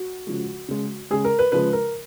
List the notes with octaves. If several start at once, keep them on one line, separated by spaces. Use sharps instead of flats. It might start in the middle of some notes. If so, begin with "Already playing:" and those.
Already playing: F#4
C#3 F3 G#3
C#3 G#3
C#3 G#3 G#4
A#4
B4
C#3 F3 G#3 B4
A#4